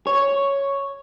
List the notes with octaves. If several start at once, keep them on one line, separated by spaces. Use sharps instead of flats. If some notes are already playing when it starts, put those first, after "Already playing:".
C#5